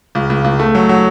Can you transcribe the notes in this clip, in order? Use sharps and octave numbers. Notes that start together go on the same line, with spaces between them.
C#2
C#2
C#2
A3
F#3
F#3